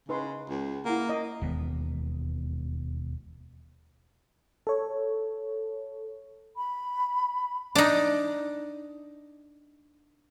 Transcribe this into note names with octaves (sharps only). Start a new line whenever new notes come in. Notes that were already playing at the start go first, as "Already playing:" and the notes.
C#3 D#4 B4 C6
C#2
A#3 E4 F#5
D#5
E1 D#2 G#3 B3
A4 C#5
B5
D4 D#4